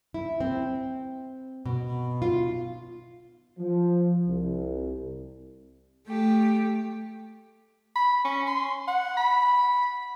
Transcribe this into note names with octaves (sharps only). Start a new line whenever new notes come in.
E4
C4
B2
F4
F3
C2
A3 G4
B5
C#4
C6
F#5
B5